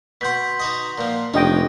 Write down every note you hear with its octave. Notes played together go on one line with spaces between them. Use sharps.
B2 F#5 C6 G6 B6
D#4 F#4 D#5
A#2 F3
F1 C#4 D4 D#5 G5